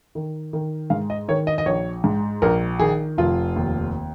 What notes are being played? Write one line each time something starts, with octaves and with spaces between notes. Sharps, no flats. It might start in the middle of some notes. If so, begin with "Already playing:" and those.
D#3
D#3
G#2 F5
D#5
D#3 C#5
D#5
D#5
A#1 C#5
G#2
A#1 A#4
D#3 G#4
F1 F4
D#2